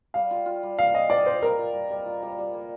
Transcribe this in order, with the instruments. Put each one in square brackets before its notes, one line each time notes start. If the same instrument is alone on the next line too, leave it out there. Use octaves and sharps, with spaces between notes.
[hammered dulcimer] G3 [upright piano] F5
[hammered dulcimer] F4
F4
G3
[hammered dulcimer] A#3 [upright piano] F5
[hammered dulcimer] F4 [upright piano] D#5
[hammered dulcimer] A#3 [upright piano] D5
[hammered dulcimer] F4 [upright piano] C5
[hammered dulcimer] G3 [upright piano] A#4
[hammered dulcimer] F4
G3
G3
F4
G3
G3
A#3